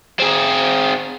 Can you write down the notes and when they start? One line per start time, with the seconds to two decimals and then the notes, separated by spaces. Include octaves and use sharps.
0.19 C4 G#4